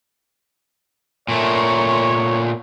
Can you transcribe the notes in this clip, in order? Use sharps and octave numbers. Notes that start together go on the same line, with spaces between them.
A#2 A3 C#5